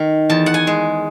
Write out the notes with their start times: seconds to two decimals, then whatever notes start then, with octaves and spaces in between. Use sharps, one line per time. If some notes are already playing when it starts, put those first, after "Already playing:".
Already playing: D#3
0.30 E2 A5
0.46 F#5
0.54 G#5
0.67 G#3